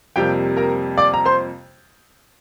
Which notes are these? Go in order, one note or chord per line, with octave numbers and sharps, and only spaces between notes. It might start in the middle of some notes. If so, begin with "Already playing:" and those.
F2 C3 G3 A#3 G4 G5
A#4 A#5
D5 D6
A#5
C5 C6